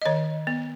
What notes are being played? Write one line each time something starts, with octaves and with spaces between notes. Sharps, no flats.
D#5
D#3 C#5
B3